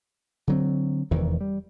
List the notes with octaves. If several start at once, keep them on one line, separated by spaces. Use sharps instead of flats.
D3 F#3 C4
F1 E2 D#3 E3
G3